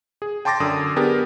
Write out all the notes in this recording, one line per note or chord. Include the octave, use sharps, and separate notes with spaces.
G#4
G5 A5 C6 D6 A6 A#6
F#2 D3 D#6
B3 D4 G4 G#4 A#4